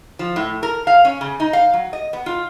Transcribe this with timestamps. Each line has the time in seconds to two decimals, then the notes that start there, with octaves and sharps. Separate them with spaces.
0.19 F3
0.36 A2
0.63 A#4
0.87 F5
1.05 C#4
1.21 C#3
1.40 D#4
1.53 F5
1.73 F#3
1.93 D#5
2.13 B3
2.26 F4